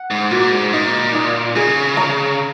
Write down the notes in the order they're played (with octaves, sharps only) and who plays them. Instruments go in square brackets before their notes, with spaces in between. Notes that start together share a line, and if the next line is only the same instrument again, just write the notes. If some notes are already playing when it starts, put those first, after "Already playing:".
Already playing: [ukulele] F#5
[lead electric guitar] G#2
[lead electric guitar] A#2 [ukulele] F#4
[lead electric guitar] G#2
[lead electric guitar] A#2 [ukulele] D#4
[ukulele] D#4
[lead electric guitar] C#3 [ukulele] G#4
[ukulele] A#5